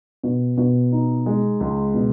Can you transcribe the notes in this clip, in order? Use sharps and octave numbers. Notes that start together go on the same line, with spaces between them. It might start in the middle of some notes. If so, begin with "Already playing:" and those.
B2
B2
D#4
G#3
C#2
B2